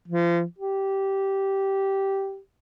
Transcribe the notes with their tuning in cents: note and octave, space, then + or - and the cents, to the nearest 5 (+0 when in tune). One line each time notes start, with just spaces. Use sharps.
F3 -30
G4 -10